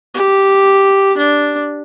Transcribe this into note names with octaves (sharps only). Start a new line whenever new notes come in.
G4
D4